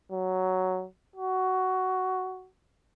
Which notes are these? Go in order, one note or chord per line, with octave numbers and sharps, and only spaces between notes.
F#3
F#4